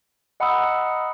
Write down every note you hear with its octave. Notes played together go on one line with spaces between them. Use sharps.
D#5 F#5 A#5 B5 D#6 E6